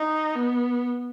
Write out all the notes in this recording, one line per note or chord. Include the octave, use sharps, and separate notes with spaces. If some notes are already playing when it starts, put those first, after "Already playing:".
Already playing: D#4
B3